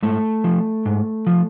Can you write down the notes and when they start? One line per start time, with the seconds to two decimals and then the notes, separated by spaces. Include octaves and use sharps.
0.03 G#2 A3
0.44 F3
0.86 G#2
1.27 F3